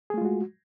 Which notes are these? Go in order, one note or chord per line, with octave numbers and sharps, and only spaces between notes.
G#3 A3 F4 F#4 G#4